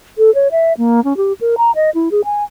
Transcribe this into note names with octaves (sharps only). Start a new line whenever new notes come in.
A4
C#5
E5
A#3
C#4
G4
A#4
A#5
D#5
E4
G#4
G#5